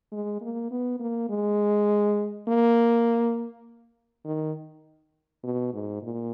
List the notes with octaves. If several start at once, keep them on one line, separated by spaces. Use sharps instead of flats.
G#3
A#3
B3
A#3
G#3
A#3
D#3
B2
G#2
A#2